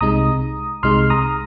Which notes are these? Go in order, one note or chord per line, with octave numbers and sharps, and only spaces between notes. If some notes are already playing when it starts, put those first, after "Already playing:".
C2 C3 G#3 D#4 A#5 D#6
C2 C3 G#3 D#4 C6 F6
A#5 D#6